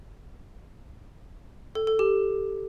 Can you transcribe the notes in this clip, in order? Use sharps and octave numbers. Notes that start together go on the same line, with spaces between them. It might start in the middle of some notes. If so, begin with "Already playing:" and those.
A4
A4
G4